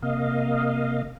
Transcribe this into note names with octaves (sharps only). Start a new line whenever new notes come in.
C3 A#3 D#5 F5